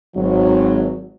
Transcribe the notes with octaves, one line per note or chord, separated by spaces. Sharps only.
G#1 F#3